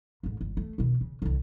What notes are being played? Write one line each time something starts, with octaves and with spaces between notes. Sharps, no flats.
A1 G#2
G1
A3
B2 D#3
C#3
C2 D3